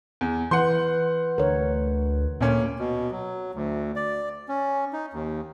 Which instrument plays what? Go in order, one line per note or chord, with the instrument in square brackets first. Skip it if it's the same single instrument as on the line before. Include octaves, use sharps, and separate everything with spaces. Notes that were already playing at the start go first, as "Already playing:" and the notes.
[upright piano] E2
[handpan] E3 [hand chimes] B4 G6 [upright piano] F#5 C6
[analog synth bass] D2 [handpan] A#4 C#5
[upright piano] D2 A#3 C#4 [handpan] A#2
[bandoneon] B2
F#3
D2
D5
C#4
D#4
D#2